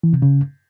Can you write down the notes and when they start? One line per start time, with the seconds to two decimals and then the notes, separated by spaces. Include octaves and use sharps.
0.03 E3
0.13 C3
0.22 C#3